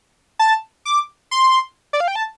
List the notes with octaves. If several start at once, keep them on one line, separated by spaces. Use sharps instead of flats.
A5
D6
C6
D5
F5
G5
A5